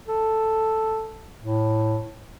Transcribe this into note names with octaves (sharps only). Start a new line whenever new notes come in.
A4
A2